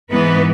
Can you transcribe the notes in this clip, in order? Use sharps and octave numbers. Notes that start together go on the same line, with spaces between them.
G#2 E3 B3 B4